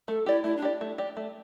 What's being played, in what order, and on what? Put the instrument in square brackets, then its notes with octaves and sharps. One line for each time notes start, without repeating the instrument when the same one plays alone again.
[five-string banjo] A3 [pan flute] A4
[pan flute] E4 [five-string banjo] G4 D5
[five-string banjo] A3 [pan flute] E4
[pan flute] D4
[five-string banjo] G4 D5
A3
G4 D5
A3